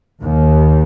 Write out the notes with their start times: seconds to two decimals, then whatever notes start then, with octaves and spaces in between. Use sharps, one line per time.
0.23 D#2